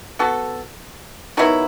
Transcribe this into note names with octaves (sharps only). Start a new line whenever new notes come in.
B3 F#4 A4
D#3 F#3 B3 E4